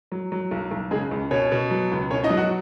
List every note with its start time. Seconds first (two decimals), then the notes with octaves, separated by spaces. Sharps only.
0.12 F#3
0.32 F#3
0.51 B1
0.71 B1
0.91 C#3 G#3 G#4
1.11 C#2
1.31 B2 C#4 C#5
1.51 B2
1.71 F#3
1.91 C#2
2.11 B2 C#4 C#5
2.24 D#4 D#5
2.30 F#3
2.37 F#4 F#5